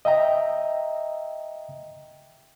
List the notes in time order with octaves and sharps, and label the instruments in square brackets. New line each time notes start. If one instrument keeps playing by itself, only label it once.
[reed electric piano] D#5 E5 G5 A#5